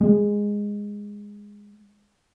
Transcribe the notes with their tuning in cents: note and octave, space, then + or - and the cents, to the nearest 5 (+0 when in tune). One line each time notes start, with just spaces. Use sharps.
G#3 -10